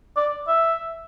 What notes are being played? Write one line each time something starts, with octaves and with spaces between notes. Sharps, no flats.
D5
E5